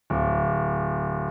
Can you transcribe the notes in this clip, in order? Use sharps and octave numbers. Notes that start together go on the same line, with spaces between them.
D1